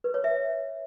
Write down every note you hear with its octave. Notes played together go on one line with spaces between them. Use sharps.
B4
C#5
E5